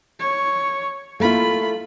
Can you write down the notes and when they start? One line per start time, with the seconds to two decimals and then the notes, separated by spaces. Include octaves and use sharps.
0.19 C#5
1.20 A3 A#3 E4 F4 B5